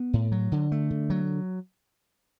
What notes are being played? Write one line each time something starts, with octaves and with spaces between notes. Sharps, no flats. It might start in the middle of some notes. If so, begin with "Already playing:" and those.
Already playing: B3
A2
F#3
D3
A3
D3
F#3